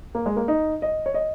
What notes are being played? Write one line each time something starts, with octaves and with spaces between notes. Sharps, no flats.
A#3
G#3
A#3
D#4
D#5
C#5
D#5